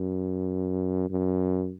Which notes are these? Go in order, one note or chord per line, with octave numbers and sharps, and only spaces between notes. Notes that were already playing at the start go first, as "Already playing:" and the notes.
Already playing: F#2
F#2